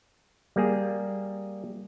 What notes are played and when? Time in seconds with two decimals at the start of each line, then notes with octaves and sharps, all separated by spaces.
0.56 G3 A#3 G#4